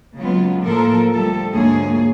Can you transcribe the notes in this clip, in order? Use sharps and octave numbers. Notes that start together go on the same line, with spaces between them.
C#3 F#3 G#3 A#3 B3 F4
A2 F3 A#3 A4 A#4
D2 F3 G3 A4
D2 G#2 F3 A#3 G#4 C#5